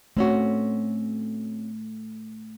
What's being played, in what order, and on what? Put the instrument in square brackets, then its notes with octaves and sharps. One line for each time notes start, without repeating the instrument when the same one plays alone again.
[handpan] A3 [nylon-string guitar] C4 C#4 F#4